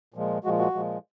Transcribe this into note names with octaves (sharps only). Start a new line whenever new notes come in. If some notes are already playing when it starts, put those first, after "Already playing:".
A#2 F3 G#3
A#2 F3 G#3 F#4
F#4
A#2 F3 G#3